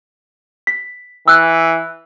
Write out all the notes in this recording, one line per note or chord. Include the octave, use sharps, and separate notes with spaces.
B6
E3 E6 F#6